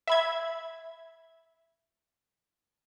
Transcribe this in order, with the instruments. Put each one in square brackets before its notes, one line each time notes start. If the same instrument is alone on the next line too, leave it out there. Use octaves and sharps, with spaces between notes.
[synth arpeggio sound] E5 B5 G#6